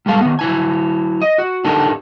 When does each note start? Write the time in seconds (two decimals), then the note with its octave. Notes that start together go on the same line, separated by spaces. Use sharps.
0.06 G3 G#3 A4 F5
0.21 D#3 B3
0.39 F#3 E4 G#5
1.22 D#5
1.38 F#4
1.65 D4 D#4 G4 A4 A#4